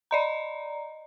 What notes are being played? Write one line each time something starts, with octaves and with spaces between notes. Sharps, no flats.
D5 D#5 A#5